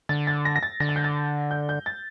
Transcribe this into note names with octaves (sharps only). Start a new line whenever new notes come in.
D3 A6
A6
A#6
A#6
A6
D3 A#6
A6
G6
A6
G6
G6
A6